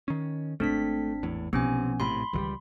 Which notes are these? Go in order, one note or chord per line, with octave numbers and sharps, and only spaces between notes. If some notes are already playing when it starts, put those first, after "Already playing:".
D#3 C#4
D#1 G#1 A3 C4 D4 B6
E2 A2
B1 C3 F3 B3 C#4 G#5
A#1 A2 C3 B5 C6
C#2 D#3 E3 F#3 G3